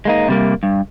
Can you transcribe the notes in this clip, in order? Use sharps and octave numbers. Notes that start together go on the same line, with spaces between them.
G#3 A#3 D#4
C3 G3 A#3
G2